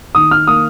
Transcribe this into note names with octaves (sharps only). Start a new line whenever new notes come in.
D#3 D#6
F6
A#3 D#6